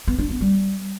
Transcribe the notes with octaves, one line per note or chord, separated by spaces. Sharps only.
B3
D4
B3
G3